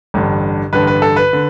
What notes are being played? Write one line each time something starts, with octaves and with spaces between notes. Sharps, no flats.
A1 G2 D3
A1 G2 D3 B4
B4
A4
B4
D3